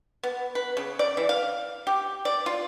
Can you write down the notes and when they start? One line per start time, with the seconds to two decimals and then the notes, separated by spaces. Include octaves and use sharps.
0.23 B3
0.55 B4
0.77 C#3
0.99 D5
1.17 E3
1.29 F5
1.87 G4
2.25 D5
2.46 F4